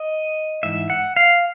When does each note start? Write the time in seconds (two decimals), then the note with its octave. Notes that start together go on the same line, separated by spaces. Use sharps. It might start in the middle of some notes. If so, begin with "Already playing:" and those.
Already playing: D#5
0.63 G#2 E3 E5
0.90 F#5
1.16 F5